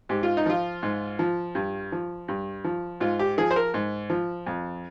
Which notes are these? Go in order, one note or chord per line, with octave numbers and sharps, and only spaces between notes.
G#2 G4
F4
D#4
F3 F4
G#2
F3
G2
F3
G2
F3
G#2 F4
G4
F3 G#4
C5
A#4
G#2
F3
F2